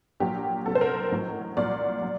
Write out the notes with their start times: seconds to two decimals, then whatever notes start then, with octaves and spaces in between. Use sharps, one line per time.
0.20 A#1 A#2 F#3 G4
0.66 C2 C3 F#3 A4
0.75 C5
0.81 A#4
1.12 A1 A2 F#3
1.57 C2 A#2 F#3 D5
2.02 F#3